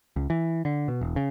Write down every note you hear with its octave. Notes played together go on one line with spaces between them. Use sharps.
C#2
E3
D3
B2
E1
C#3